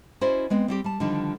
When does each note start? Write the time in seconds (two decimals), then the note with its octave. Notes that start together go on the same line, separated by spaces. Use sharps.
0.21 C#4 E4 F#4 C5 D5 D#5
0.50 G#3 B3 C4
0.68 G3 C4 G4
0.84 G3 A5
1.00 D3 D#3 F3 G3 D4 D#4